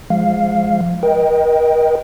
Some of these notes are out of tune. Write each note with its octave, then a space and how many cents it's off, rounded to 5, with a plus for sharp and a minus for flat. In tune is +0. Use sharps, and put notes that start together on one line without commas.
F3 -5 G#3 +0 F5 +0
A#4 +35 D#5 +5 G5 +0